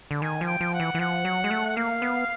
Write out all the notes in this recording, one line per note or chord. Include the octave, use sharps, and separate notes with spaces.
D3
D#3 G#5
F3
G5
F3
F#5
E3
E3
F3 F#5
F#3
G#3
A3
F#5
A#3 F5
B3